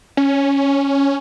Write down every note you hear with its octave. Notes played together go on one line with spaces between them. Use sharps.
C#4